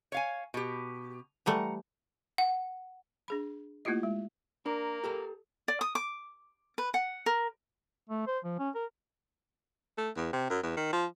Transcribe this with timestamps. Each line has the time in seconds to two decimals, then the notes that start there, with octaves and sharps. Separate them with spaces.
0.12 C#5 F5 G#5
0.54 B2 G4
1.46 E3 G3 A3 F#5 A#5
2.38 F#5
3.28 D4 G#4 B5
3.85 A3 A#3 E4 F4 G4 D#5
4.03 G#3
4.66 A#3 D4 A#4
5.04 G4 A4 A#5
5.68 D5
5.81 D#6
5.95 D6
6.78 B4
6.94 F#5
7.26 A#4
8.10 A3
8.27 C5
8.45 F3
8.59 C#4
8.75 A#4
9.98 A3
10.16 E2
10.33 C3
10.50 F#2
10.63 E2
10.77 D#3
10.93 F3